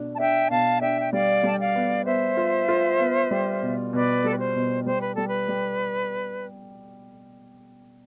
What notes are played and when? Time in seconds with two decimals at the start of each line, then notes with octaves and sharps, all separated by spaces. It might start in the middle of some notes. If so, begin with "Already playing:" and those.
Already playing: B2 D4
0.14 A5
0.19 D4 E5 G5
0.50 B2 F5 A5
0.81 D4 E5 G5
1.01 G5
1.13 G3 D5 F5
1.43 G3 A5
1.52 G5
1.60 D5 F5
1.75 B3
2.06 B3 C5 E5
2.37 F4
2.68 F4
2.99 B3
3.31 G3
3.62 B2
3.93 B2 B4 D5
4.22 G3 A4
4.31 B4
4.39 C5
4.55 B2
4.86 G3 C5
5.01 B4
5.14 G3 A4
5.28 B4
5.49 G3